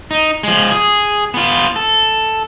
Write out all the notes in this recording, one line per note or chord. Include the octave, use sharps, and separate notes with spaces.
D#4
F3 G#3
G#4
B3 F4
A4